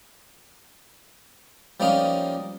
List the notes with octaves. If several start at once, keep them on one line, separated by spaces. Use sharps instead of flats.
F3 G3 A#3 C#4 D#4 F5